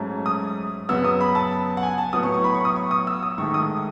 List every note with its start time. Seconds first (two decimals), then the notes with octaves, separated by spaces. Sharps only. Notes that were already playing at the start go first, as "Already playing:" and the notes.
Already playing: G#2 F#3 A3 C#4
0.26 D#6
0.89 F#2 C#3 F#3 B3 E6
1.04 D#6
1.21 B5
1.35 A5
1.77 F#5
1.83 G#5
1.98 A5
2.13 A2 F#3 B3 D#6
2.23 C#6
2.34 C#6
2.44 B5
2.54 C#6
2.65 D#6
2.76 C#6
2.91 D#6
3.07 E6
3.22 D#6
3.38 G#2 D#3 A3 C#6
3.54 D#6